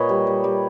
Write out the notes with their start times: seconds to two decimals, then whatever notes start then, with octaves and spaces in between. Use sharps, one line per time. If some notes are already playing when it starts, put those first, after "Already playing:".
Already playing: A#2 B4 C#5 D#5
0.09 G3
0.27 G3
0.44 G3